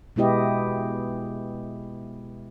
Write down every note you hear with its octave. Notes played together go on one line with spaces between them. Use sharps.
B2 G#3 B3 E4 G4 D#5